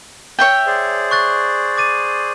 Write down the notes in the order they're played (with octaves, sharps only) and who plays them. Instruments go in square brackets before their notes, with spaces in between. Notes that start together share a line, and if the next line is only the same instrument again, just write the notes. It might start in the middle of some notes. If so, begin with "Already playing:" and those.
[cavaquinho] C#5 E5 G5
[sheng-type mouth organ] G#4 C5 D5
[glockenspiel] C#6 F#6 A6
D6 A6 D#7